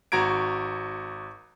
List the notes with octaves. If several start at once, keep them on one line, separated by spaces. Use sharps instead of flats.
G#1 F#4 A#5 G#6 D7